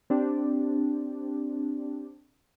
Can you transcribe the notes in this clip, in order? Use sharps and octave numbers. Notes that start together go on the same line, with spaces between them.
C4 D4 G4